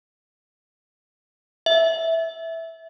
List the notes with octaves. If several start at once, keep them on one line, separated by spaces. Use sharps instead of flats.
E5